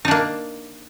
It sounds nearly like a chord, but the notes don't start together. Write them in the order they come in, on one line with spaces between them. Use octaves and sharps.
D#4 D4 A#3